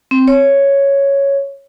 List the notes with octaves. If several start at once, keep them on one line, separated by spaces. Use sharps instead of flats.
C4
C#5